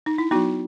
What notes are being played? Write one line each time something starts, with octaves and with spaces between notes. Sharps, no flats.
D#4
E4
F#3 B3 D#4 F#4